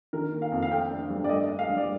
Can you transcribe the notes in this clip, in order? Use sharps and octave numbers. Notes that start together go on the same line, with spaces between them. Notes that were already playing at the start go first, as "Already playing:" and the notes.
D#3 A#4
A#3
F5
F2
F5
A3 G5
D4
G2
D5
A3 D#5
D4
F5
G2
D5